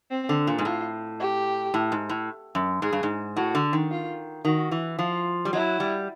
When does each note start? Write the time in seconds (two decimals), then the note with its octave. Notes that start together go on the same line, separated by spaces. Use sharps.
0.11 C4
0.29 D3
0.47 A#2
0.58 G#2
0.65 A2 F4
1.20 G4
1.74 A2
1.92 G#2
2.09 A2
2.55 F#2
2.82 G#2 G#4
2.92 G2
3.03 G#2
3.37 A2 F#4
3.55 D3
3.73 D#3
3.90 F4
4.45 D#3 F#4
4.71 E3
4.99 F3 F4
5.45 G3
5.53 F#3 E4
5.80 G3